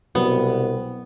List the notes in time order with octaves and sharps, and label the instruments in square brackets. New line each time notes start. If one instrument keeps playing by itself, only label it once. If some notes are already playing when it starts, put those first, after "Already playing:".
[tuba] C2 [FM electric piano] B2 F#3 [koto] B3